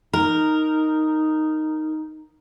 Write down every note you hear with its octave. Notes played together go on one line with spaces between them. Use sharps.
D#4 A#4